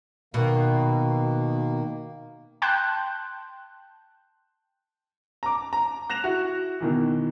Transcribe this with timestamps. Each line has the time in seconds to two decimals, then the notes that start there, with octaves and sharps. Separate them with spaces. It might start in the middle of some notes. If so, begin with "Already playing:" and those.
0.34 B2 D#3 A#3
2.62 G5 A5 C6 F#6 G6
5.43 A#5 D6
5.73 A#5
6.10 F#6 A#6 E7 F7
6.24 E4 F#4
6.81 B2 D#3 E3